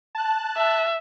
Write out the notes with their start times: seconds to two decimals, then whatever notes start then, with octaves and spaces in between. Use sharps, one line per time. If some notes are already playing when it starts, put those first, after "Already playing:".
0.15 A5 F#6
0.57 E5